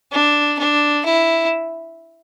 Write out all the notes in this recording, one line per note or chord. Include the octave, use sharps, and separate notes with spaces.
D4
D4
E4